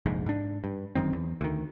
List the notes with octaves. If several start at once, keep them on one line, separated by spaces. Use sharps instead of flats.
F1 A#1 G#2
G#2 D4
G2
G1 F#2 D#3 C4
E2
D2 D#3